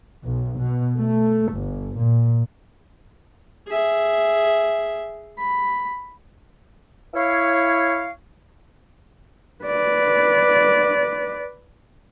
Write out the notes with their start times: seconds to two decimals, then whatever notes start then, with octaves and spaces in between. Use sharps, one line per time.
0.23 B1
0.59 B2
0.97 A3
1.52 G1
1.97 A#2
3.68 G#4 E5
5.38 B5
7.14 E4 C#5 F5
9.64 B4 D5